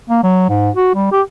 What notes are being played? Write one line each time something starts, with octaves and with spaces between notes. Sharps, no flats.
A#3
F#3
G#2
F#4
G3
G4